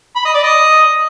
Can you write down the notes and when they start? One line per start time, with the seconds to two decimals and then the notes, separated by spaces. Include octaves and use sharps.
0.16 B5
0.25 D#5
0.34 D5
0.43 D#5